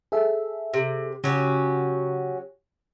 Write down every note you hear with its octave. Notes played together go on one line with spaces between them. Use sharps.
G#4 A4 E5
C3
C#3 F#3 C#4 G4